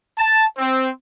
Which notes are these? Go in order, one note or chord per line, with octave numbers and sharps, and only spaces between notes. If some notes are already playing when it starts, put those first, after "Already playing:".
A5
C4